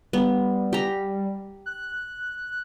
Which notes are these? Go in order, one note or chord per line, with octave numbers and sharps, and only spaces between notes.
G3 B3
G4 A#5
F#6